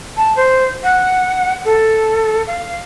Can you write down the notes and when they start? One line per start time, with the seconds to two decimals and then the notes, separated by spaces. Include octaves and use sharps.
0.17 A5
0.36 C5
0.83 F#5
1.65 A4
2.47 F5